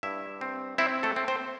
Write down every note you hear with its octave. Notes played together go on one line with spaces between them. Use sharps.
G2 E4 E5
C4
C4 E4 E5
A3 A4
C4
C4 C5